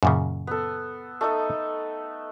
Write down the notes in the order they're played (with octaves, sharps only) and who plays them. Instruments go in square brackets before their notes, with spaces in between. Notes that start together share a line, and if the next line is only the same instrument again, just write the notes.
[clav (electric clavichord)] F#2 A#2 C#3
[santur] B3 A4
A3 D#4 A4